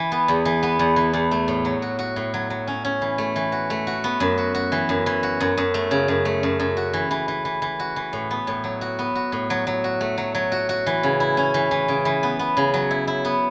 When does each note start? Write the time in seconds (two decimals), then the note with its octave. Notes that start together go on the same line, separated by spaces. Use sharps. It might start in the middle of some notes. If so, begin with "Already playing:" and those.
Already playing: E3
0.12 B3
0.28 E2
0.45 E3
0.63 B3
0.79 E2
0.96 E3
1.13 E2
1.31 A3
1.48 A2
1.65 F#3
1.82 F#4
1.99 F#4
2.16 A2
2.34 F#3
2.50 F#3
2.67 C#4
2.85 C#4
3.01 E3
3.18 A3
3.36 E3
3.52 F#4
3.70 A3
3.87 F#4
4.04 B3
4.20 F#2
4.38 F#4
4.55 F#4
4.72 E3
4.89 F#2
5.06 E3
5.23 F#4
5.40 F#2
5.57 F#2
5.74 A3
5.91 C#3
6.08 F#2
6.25 A3
6.43 F#2
6.60 F#2
6.77 F#4
6.93 E3
7.11 E3
7.28 E3
7.45 E3
7.62 E3
7.80 F#4
7.96 E3
8.13 A2
8.31 B3
8.47 A2
8.64 F#3
8.81 F#4
8.99 B3
9.15 F#4
9.32 A2
9.50 F#3
9.67 F#3
9.84 F#4
10.01 A3
10.18 F#3
10.35 F#3
10.52 F#4
10.69 F#4
10.86 E3
11.03 C#3
11.20 E4
11.37 C#4
11.54 E3
11.71 E3
11.88 C#3
12.05 E3
12.23 B3
12.39 B3
12.57 C#3
12.74 F#3
12.91 E4
13.07 E4
13.25 B3